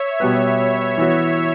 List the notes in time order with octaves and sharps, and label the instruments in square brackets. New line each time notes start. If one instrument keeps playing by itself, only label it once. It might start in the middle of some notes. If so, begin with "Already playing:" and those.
Already playing: [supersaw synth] C#5 E5
[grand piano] B2 G3 B3 F#4 B4
E3 B3 F#4